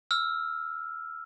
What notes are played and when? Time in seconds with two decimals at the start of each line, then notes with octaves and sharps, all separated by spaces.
0.11 E6 F6